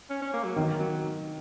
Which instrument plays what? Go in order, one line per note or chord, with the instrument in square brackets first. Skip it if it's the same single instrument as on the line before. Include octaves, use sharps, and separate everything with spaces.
[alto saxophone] C#4
C#4
A#3
F#3
[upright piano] D#3
[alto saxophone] F#3